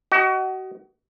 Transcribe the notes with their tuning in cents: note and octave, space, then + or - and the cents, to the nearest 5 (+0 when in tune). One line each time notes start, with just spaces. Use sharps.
F#4 +35 D#5 +0